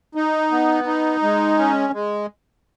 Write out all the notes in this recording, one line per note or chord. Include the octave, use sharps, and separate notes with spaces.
D#4
B3
D#4
G#3
C#4
G#3